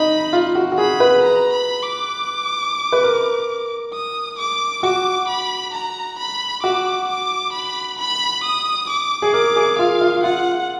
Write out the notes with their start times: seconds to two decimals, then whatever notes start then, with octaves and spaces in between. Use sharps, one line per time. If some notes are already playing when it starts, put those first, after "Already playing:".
Already playing: D#4 B5
0.33 F4
0.55 F#4
0.72 F#4
0.78 G#4 B5
1.00 B4
1.23 A#5
1.53 B5
1.83 D6
2.92 B4
3.04 A#4
3.93 D#6
4.39 D6
4.83 F#4 D6
5.28 B5
5.73 A#5
6.19 B5
6.63 F#4 D6
7.09 D6
7.53 B5
7.99 B5
8.44 D#6
8.89 D6
9.22 G#4
9.34 A#4 D6
9.56 G#4
9.79 F4 F5
10.01 F4
10.24 F4 F#5